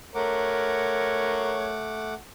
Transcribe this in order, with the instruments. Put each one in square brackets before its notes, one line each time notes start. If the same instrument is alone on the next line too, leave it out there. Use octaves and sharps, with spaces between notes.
[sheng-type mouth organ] A3 F#5 D6 [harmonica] A#4 C#5